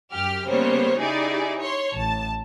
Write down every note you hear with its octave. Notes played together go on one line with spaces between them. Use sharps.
F#2 G4 F6
C#3 G3 A#3 B3 C5 C#5
D#4 E4 G4 G#4 D5
C#5 C6
A1 A5